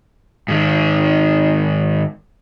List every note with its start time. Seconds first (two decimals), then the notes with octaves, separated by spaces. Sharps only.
0.48 G#2 D#3